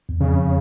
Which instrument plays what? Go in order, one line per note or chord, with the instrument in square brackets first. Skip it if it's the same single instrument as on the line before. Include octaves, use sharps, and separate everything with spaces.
[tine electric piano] E2
[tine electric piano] F2 [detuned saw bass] C#3